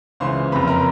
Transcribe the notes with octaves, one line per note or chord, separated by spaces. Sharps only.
C#2 C#3 E3 C5 C6
F#1 F2 C3 B4 B5
A#4 A#5